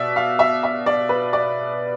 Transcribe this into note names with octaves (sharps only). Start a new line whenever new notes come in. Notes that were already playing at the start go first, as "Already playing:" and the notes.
Already playing: B2 D5 E5
F5
E5
E5
D5
B4
D5